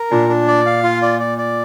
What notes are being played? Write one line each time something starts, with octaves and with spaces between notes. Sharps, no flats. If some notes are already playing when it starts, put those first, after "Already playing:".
Already playing: A#4
A#2 D4
D4
D5
F5
F4
D5
D5
D5